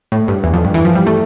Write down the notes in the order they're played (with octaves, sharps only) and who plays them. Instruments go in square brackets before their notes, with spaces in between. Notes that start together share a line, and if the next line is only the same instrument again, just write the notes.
[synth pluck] A2
G2
E2
F2
G2
E3
F3
G3
A3